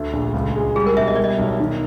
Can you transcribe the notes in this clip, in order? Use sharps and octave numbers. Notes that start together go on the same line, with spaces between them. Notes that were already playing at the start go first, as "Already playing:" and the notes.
Already playing: D2 A3
A#1
C#2
G#3
G3 G#4
A#4
B1 E5
D#5
G3 D5
D#5
B1
D#3